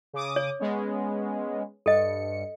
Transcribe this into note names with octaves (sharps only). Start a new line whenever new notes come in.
C#3 D6 D#6
C#5
G#3 B3 C#4
G2 A4 D#5 C#7